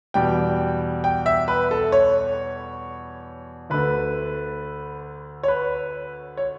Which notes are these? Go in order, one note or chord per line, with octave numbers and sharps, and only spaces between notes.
E2 B2 G3 G5
G5
E5
B4
A4
C#5
D2 D3 A3 B4
C#5
B4
C#5